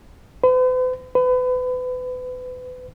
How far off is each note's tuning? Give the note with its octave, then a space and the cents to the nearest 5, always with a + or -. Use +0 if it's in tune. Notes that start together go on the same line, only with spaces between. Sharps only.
B4 +45
B4 +30